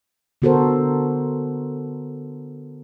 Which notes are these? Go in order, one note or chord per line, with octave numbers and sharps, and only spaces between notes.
D3 B3 F#4 A4 A#4 C5